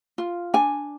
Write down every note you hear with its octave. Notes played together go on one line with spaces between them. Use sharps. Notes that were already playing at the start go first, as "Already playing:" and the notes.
F4
D4 G#5